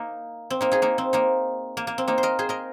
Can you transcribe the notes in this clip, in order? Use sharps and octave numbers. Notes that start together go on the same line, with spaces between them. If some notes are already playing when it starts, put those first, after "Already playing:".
Already playing: A#3 D#4
C4
A#3 D#4
D#4 G#4
A#3 D#4
C4
A#3 D#4
A#3
A#3
C4
A#3 D#4
C5
A#4 D#5
G#4 C5
A#4 D#5